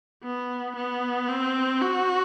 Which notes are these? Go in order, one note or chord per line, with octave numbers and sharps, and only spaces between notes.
B3
B3
C4
F#4